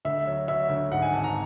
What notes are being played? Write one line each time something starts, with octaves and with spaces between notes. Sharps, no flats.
D2 E5
F#3
F#3 E5
D2
G#2 F#5
G#5
G#1 A5
A#5